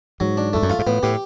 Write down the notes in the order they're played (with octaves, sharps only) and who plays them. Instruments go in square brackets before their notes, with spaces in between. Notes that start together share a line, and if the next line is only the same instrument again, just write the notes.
[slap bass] G#2 [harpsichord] F#3
[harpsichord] D4
[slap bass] F2 [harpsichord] A3
[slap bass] F#2
[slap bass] G2 [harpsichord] F4
[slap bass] G#2
[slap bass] A2 [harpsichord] B3
[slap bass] A2 [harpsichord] G4